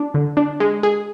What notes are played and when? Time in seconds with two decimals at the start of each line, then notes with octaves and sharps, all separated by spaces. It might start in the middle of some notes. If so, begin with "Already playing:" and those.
Already playing: D4
0.14 D3
0.37 D4
0.60 G#3
0.83 G#4